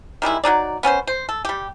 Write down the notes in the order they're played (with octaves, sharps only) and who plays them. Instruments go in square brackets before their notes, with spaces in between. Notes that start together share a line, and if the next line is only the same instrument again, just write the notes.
[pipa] D#3 G3 G#3 E4
F#3 A3 D#4 D5
B3 C#4 A4 C5
C5
A4
G3 G4